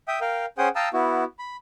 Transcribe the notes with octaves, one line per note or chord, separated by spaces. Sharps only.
E5 G5 D#6
A#4 F5 G5
C#4 G#4 C5 F#5 G5 D#6
F5 G5 A5 A#5 D#6 E6
B3 E4 F#4
B5